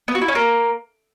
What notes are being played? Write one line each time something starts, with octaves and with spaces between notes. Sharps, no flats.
B3
F#4
E4
C#4
A#3